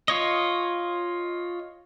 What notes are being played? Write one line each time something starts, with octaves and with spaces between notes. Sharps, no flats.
F4 C#5 D#5